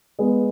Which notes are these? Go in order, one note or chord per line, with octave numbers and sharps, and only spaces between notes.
G#3 B3